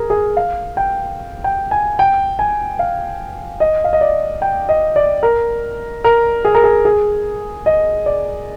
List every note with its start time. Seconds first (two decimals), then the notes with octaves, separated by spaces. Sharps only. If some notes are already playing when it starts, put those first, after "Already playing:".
Already playing: G#4 A#4
0.10 G#4
0.37 F5
0.77 G5
1.44 G5
1.71 G#5
1.99 G5
2.39 G#5
2.79 F5
3.60 D#5
3.84 F5
3.93 D#5
4.01 D5
4.42 G5
4.69 D#5
4.96 D5
5.23 A#4
6.04 A#4
6.45 G#4
6.54 A#4
6.64 G#4
6.85 G#4
7.66 D#5
8.06 D5